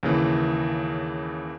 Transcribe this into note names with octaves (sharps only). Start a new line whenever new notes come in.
D#2 C#3 E3